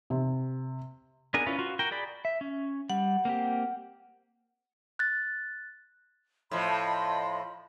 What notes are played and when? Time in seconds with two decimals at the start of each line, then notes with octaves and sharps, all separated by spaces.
0.10 C3
1.34 B3 D4 G#4 A#4 G#5
1.46 C#4 E4 F4 B4
1.59 F4 F#4
1.79 F#4 A#4 G5
1.91 G#4 D5 B5
2.25 E5
2.41 C#4
2.90 G3 F#5
3.25 A#3 C4 G4
4.99 F#6 A6
6.51 A2 F3 D#5 B5 C6